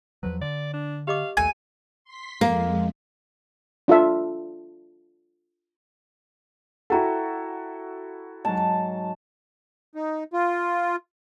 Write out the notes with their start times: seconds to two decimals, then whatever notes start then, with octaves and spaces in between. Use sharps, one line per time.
0.23 E2 F3 F#3 B4
0.41 D3 D5
0.73 D4
1.07 G4 D#5 F5 D6
1.37 A#1 D#2 A3 G#5
2.04 C6 B6
2.41 F2 G#3 A#3
3.88 D4 F4 A4 E5
6.90 E4 F#4 A4 F#5 G5 A#5
8.45 G#2 F#3 A5
9.95 D#4
10.33 F4